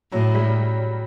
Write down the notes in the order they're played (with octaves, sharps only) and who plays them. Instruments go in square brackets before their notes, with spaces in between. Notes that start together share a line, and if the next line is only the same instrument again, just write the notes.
[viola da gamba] A2 [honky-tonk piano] F#3
[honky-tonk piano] G3